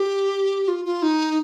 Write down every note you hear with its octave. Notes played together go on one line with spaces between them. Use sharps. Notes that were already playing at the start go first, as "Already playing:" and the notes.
Already playing: G4
F4
F4
D#4